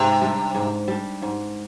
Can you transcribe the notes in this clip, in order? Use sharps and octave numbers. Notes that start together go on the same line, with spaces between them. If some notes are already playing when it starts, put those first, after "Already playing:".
Already playing: G#2 C3
G3 D4
G#2
G3 D4
G#2